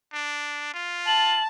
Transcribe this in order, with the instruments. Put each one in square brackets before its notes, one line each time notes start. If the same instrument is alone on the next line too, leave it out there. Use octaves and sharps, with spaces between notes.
[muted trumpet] D4
F4
[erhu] A5 [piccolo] F#7